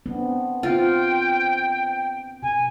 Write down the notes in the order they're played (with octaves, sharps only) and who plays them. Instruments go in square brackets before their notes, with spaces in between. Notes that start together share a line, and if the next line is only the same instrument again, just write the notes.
[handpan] B3 C4 D4
[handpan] C4 [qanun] F4 [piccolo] G5
[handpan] B2 [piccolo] G#5